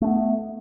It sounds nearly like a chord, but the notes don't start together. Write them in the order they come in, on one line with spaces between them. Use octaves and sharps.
A3 D4 B3